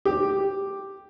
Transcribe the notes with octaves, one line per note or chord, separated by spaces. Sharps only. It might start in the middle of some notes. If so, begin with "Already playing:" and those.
G4